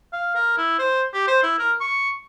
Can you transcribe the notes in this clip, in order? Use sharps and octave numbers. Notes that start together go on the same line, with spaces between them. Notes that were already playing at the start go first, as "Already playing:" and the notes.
F5
A#4
E4
C5
G4
C5
E4
A#4
C#6